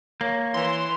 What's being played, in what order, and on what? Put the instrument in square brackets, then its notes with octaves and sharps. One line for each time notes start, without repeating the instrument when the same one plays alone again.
[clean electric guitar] A#3 [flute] C#5
[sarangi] E3 [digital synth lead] C6